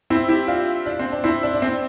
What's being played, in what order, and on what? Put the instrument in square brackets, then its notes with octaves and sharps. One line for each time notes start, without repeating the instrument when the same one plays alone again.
[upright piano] C4 E4
E4 G4
D4 F4
D4
C4
D4
C4 E4
D4
D4
C4